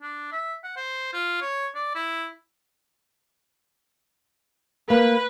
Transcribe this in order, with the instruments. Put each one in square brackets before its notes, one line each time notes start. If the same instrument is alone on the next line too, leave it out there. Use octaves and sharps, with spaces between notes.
[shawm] D4
E5
F#5
C5
F4
C#5
D5
E4
[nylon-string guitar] A#3 [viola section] B4